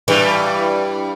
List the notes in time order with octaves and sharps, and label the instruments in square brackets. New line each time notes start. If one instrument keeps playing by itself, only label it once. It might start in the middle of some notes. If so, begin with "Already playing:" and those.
[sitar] G2 G3 [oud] E3